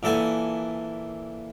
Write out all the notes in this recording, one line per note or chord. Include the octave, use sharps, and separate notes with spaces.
A#2 E3 A4 F#5 G#5